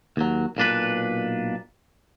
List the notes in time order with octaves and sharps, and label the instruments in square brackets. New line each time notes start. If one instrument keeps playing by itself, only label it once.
[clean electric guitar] D#2 F#3
B1 A#2 D4 B4